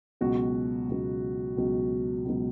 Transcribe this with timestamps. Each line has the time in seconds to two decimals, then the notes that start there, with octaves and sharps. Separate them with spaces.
0.21 C#2 B2 F#3 F#4
0.89 C#2 B2 F#3
1.57 C#2 B2 F#3
2.25 C#2 B2 F#3